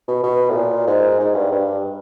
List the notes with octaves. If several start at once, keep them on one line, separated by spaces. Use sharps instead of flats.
B2
B2
A2
A#2
G#2
G#2
G2
G2